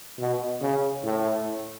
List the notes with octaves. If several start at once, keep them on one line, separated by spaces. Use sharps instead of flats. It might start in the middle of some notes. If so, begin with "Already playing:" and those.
B2
C#3
A2